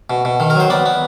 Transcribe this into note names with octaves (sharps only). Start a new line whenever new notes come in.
B2
B2
D#3
A#4
F#3 C5
B3 D5
B3